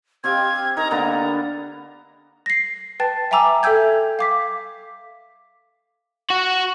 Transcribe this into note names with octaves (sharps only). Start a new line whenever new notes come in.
C4 G4 F5 G#6
D#4 A#4 A#5
D3 A#3 B3 A#5
A#6 C7
B4 G5 A5 A6
E5 G5 G#5 A#5 D6 E6
A4 E5 G5 E6 G6 G#6
F5 D6 B6
F#4